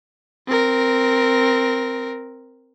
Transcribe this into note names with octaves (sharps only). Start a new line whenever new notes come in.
C4 A#4